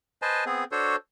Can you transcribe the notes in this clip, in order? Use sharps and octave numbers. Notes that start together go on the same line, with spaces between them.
B4 C5 D#5 G#5 A5
B3 C4 G#4
D4 F#4 A4 C5 C#5